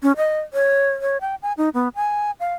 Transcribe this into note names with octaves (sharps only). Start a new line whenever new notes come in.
C#4
D#5
C#5
C#5
G5
G#5
D#4
B3
G#5
F5